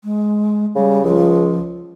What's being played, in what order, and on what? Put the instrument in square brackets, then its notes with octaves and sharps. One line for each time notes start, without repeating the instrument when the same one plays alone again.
[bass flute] G#3
[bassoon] C#3 [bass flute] G3
[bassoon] C#2 [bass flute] F3